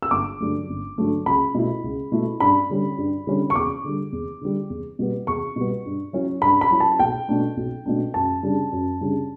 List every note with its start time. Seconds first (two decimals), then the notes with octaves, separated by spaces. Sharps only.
0.02 E6
0.11 G1 D6
0.40 G2 D3 F#3 A3
0.69 G1
0.98 G2 D3 F#3 A3
1.26 C#2 B5
1.54 B2 A3 E4
1.84 C#2
2.12 B2 A3 E4
2.40 G2 B5
2.70 D3 G3 C#4
2.98 G2
3.27 D3 G3 C#4
3.50 C#6
3.56 E2 D6
3.84 D3 G3
4.12 E2
4.41 D3 G3
4.70 E2
4.99 B2 G3 B3
5.27 E2 C#6
5.56 B2 G3 B3
5.86 G2
6.13 F#3 C#4 E4
6.42 G2 B5
6.61 B5
6.70 F#3 C#4 E4
6.80 A5
6.99 B1 G5
7.29 B2 A3 D4
7.57 B1
7.86 B2 A3 D4
8.14 F#2 A5
8.43 C#3 G3 D4
8.72 F#2
9.01 C#3 G3 D4